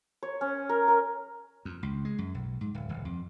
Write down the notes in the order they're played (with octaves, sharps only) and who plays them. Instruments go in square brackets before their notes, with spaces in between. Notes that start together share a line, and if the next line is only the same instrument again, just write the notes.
[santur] C#5
C#4
A#4
A#4
[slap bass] F2
C#2
G#3
F#2
B1
G#2
D1
D1
F2